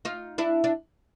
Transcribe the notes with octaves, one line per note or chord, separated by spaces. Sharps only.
D#4 F4
D4 E4
D4